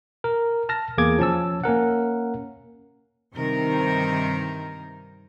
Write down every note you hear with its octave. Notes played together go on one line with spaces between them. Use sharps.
A#4
A5 F6 A#6
E2 A#3 G#4 D6 G#6
F3 C#4 A5 E6
A#3 C#4 A#4 F#5
G2 C3 D#3 D#4 A#4 C5